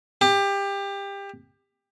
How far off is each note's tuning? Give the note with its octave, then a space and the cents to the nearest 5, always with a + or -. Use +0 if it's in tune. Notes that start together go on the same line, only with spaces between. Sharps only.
G4 +25